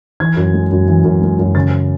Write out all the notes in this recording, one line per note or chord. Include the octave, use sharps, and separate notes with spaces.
E3 G#6
F#2
G#3
F#2
E3
F#2
G#3
F#2
C#3 A6